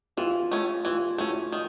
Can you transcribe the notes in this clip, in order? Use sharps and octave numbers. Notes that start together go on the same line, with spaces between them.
E3 F4 G4
A3 C#4
E3 F4 G4
A3 C#4 E4 F#4
D#3